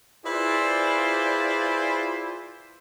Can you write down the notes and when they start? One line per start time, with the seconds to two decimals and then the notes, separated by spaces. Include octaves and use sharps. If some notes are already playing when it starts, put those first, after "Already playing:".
0.24 E4 F4 G#4 B4 C5 D5